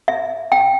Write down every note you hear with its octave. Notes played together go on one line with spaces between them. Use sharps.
E5
G5